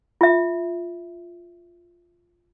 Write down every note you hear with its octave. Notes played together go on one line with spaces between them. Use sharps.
F4 E5